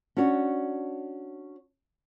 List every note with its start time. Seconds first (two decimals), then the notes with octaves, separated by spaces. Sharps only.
0.17 C#4 D4 F#4 C#5